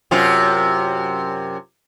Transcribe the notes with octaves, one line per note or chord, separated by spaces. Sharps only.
F#2 C3 F4